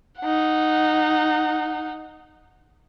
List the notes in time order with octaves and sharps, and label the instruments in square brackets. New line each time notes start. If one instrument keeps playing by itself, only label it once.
[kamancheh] D#4 F#5